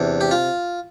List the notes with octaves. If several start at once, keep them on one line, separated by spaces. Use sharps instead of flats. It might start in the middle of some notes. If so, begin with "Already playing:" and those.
Already playing: E2 C3 D4
G4
F4